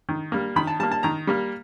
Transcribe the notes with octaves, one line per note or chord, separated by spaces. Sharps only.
D#3
G3 A#3
D#3 B5
A5
G3 A#3 A5
A5
D#3 A#5
G3 A#3